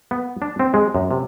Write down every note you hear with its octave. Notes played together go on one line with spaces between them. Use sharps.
B3
D4
C4
G#3
F#2
C3